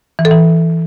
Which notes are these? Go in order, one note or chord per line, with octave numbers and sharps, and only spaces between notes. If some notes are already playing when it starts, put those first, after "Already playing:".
E3
A4
E3